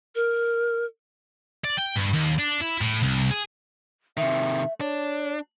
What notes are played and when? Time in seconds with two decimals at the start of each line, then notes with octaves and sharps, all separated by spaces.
0.15 A#4
1.64 D5
1.77 G5
1.96 G2
2.13 D#2
2.38 D4
2.61 E4
2.81 A2
3.03 C2
3.31 G#4
4.17 C3 D#3 E5
4.81 D4 C#5